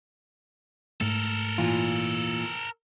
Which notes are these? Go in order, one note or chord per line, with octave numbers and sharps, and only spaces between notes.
G#2 A3 A4 A#4
A#2 E3 F4